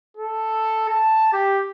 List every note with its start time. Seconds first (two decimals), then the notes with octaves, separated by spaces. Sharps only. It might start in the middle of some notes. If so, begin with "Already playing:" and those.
0.17 A4
0.89 A5
1.33 G4